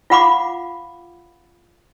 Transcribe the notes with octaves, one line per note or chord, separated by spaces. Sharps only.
F4 F5 F#5 B5 C#6 D6